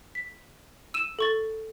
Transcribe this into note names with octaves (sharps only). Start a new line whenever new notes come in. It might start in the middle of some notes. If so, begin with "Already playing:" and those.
B6
E6 D#7 E7
A4 C#6 A6